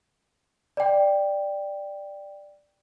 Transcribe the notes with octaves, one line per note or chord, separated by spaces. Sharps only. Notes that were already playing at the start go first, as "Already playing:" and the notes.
D5 G5